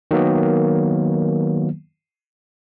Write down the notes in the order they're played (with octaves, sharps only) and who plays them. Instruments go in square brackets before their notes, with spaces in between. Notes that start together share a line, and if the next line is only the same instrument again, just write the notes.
[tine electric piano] D#3 F#3 A#3 B3